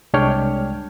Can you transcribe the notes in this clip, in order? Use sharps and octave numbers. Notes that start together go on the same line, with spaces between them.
C2 G#3 D4 C#5 G5 F6